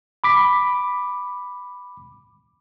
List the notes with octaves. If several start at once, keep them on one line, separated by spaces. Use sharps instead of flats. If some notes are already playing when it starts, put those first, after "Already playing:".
B5 D6 B6